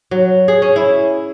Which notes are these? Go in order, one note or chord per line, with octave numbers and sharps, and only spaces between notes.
F#3
G#4
C#4
E4